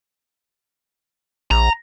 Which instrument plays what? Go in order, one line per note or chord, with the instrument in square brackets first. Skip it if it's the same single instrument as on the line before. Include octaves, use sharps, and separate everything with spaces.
[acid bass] A#1 [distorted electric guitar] A#5